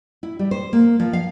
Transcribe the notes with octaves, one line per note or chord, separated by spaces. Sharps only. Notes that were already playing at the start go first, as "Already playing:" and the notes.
E4
G3
C5
A#3
F3
F5